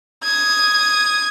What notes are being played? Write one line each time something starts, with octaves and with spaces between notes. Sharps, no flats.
D#6 G#6